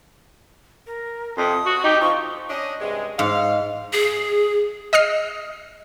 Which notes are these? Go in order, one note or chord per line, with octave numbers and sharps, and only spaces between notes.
A#4
F2 C3 D#6
F#4
D#4 G4
F3 C#6
C#4 D4 D#5
G2 C3 G#3
G#2 F5
G#4
D#5 D#6 F6 C7